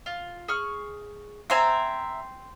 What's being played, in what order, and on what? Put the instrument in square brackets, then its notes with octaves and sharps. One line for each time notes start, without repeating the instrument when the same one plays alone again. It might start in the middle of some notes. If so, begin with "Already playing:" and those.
[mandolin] F4
G#4 C#6 F6
[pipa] C4 C5 G#5 [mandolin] E5 A#5